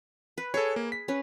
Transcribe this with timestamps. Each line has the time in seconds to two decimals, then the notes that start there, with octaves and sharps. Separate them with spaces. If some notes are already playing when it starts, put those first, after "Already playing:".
0.38 B4
0.54 G#4 A4 C#5
0.76 A#3
0.92 B6
1.08 C#4 B4